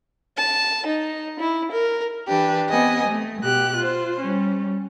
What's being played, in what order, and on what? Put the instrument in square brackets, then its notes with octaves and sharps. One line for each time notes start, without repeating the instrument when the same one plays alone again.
[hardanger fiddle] A5
D#4
E4
A#4
[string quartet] E3 D4 G4 B4
B3 C4 G4 D#5 G#5
A3
B2 G4 F#6
F4 C5
G3 C#4